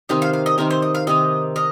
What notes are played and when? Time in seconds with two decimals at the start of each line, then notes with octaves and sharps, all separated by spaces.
0.09 C3 D#3 C4 D#4 D#5
0.22 F5
0.33 F5
0.46 D#5
0.58 C3 D#3 C4 D#4 A#4
0.70 C5
0.82 D#5
0.95 F5
1.07 C3 D#3 C4 D#4 D#5
1.56 A#4 D#5